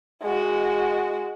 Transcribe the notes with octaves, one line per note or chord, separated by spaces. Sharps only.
G#3 F#4